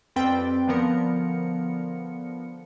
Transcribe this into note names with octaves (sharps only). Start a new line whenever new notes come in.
F2 G3 C4 B4 G5 A6
D3 F3 B3 A#4 C#7